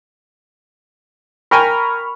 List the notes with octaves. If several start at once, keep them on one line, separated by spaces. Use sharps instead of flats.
A#4 G5 G#5 B5 C#6 F6